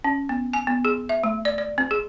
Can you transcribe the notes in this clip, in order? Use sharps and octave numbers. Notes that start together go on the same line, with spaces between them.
C#4
B3
G#5
B3
G#4
E5
A3
D5
D5
C4
G#4